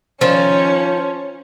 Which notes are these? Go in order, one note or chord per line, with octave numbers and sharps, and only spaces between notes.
D#3 F3 C#4